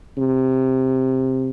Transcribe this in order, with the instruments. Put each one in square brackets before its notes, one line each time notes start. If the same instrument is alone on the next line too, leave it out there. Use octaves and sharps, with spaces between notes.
[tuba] C3